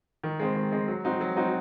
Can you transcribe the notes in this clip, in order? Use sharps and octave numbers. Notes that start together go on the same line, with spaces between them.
D#3
G#3 C4
D#3
G#3 C4
F#3
C4 D#4 F#4
F#3
C4 D#4 F#4